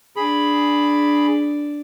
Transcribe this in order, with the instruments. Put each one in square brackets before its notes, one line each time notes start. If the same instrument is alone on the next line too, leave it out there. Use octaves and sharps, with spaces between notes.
[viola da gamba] D4 [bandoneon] G#4 B5